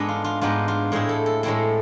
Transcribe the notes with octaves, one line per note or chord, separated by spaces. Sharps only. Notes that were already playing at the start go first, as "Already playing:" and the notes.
Already playing: G#2 G#3 B3 D4 A4
F4
F4
G#2 G#3 B3 D4 F4
F4
A2 G#3 C4 E4 G#4
A4
A4
A2 G#3 C4 E4 A4